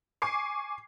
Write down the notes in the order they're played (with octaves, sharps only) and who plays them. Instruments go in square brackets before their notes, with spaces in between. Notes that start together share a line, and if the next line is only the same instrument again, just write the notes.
[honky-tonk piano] G#5 C#6 D6 C7